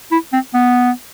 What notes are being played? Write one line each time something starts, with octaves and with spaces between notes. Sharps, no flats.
E4
C4
B3